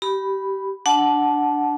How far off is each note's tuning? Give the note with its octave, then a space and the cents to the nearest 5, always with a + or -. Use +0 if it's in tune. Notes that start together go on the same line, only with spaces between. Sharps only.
G4 -20 B5 +0
D4 +0 F#5 +0 A5 -20